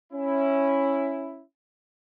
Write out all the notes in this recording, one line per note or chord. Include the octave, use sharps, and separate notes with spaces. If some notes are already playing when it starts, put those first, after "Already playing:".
C#4 E4